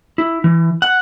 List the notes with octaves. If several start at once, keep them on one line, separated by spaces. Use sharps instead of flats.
E4
E3
F#5